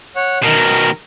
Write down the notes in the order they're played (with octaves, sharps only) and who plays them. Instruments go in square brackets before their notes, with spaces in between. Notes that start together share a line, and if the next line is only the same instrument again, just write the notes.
[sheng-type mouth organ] C#5 F#5
[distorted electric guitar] B2 D#3 [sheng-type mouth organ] A#4